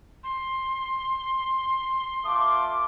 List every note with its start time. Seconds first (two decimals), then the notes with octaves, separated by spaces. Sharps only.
0.24 C6
2.25 A3 F4 D6